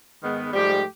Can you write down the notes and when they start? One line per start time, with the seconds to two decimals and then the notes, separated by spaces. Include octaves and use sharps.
0.23 G#2 D#3 G#3 B3
0.53 G#2 F3 G3 A3 G4